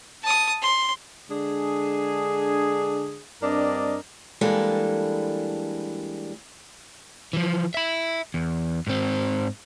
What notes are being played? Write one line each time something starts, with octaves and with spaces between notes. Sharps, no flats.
A5 D#6
C6
D3 G#3 D4 G#4
G2 C4 D4 A#4 D5 D#5
E3 G3 G#3 A#3 D4 A4
E3 F3
E5 B5
E2
G#2 C4